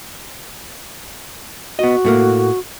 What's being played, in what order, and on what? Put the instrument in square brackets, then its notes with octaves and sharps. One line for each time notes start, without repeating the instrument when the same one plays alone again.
[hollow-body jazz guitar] B3 D#5 [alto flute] F#4
[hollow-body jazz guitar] A2 A3 A#3